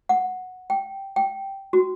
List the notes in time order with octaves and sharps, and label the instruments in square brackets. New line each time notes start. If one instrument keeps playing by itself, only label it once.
[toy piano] F#5
G5
G5
F#4